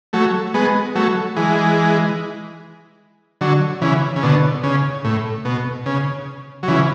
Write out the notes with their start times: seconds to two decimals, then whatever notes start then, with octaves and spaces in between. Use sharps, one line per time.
0.13 F#3 A3
0.54 G#3 B3
0.95 F#3 A3
1.36 E3 G#3
3.41 D3 F#3
3.81 C#3 E3
4.16 C#3
4.23 B2 D3
4.63 C#3
5.05 A2
5.45 B2
5.86 C#3
6.63 F#3
6.68 C#3 E3